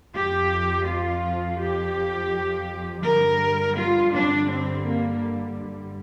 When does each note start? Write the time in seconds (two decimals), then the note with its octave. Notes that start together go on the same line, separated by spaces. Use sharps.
0.14 F2 F3 G4
0.86 F4
1.59 G4
3.03 G2 D3 G3 A#4
3.76 F4
4.12 D4
4.49 C4
4.85 A#3